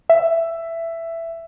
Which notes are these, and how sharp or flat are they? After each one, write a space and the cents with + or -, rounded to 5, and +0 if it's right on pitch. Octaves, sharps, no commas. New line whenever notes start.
E5 +10